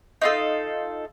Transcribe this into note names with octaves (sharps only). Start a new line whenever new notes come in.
D#4 F4 A4